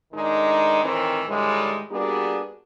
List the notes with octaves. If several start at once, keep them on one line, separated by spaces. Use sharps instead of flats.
A2 D#3 G#3 D4 D#4
A2 D#3 E3 C4
A2 D3 D#3 G3 G#3
G3 A#3 B3 D4 F#4 G#4